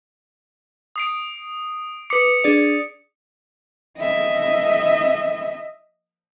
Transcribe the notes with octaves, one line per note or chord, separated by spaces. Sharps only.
D#6 C7 D7
B4 D6 D#6 C7 C#7
D4 G#4 D5
D#5 E5